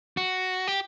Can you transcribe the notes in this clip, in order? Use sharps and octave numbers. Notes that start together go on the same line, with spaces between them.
F#4
G4